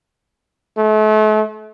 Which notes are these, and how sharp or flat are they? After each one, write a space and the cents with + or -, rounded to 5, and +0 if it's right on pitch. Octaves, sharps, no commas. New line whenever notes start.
A3 -40